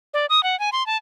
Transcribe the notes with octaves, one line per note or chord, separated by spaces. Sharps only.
D5
D#6
F#5
G#5
C6
A5